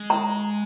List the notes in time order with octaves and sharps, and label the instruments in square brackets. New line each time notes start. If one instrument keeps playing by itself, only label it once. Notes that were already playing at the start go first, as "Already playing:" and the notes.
Already playing: [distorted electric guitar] G#3
[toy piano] A#5